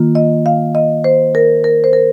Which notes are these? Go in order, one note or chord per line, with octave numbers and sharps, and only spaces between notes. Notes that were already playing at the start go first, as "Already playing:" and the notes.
Already playing: D#3 A#3 F4
D#5
F5
D#5
C5
A#4
A#4
C5
A#4